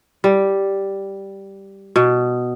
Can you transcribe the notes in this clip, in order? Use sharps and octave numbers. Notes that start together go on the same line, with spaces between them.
G3
B2